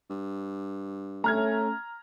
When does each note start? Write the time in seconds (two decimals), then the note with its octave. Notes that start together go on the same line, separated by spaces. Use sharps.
0.10 G2
1.24 A3 C#4 A#5 F6 G#6